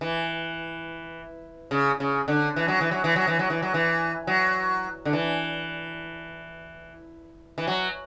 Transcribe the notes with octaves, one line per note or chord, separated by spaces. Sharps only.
E3
C#3
C#3
D3
E3
F#3
E3
F#3
E3
F#3
E3
F#3
E3
F#3
E3
F#3
D3
E3
E3
F#3